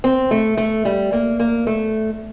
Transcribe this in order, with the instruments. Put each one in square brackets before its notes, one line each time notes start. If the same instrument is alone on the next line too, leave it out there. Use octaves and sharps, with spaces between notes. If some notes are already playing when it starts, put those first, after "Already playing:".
[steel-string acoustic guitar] C4
A3
A3
G3
A#3
A#3
A3